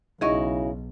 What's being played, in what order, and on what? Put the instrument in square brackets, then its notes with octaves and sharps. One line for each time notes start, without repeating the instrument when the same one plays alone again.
[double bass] B1 [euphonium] C#3 [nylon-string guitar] D#4 E4 F#4 [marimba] G#4 D#5 C#6